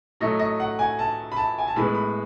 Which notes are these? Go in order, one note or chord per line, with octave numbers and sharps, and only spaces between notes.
A2 F#3 A3 D#5
D#5
F#5
G#5
A5
B5
A5
G#5
A5
A2 G#3 B3 B5
B5